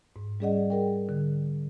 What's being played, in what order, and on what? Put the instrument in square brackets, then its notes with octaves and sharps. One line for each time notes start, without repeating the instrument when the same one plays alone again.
[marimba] G#2
G3 C#4 G#4 D5 D#5 F#5
G#4 A#4 G5
D3